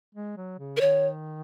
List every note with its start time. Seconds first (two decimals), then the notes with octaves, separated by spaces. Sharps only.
0.15 G#3
0.37 F#3
0.59 C#3
0.77 A#4
0.81 D#3 C#5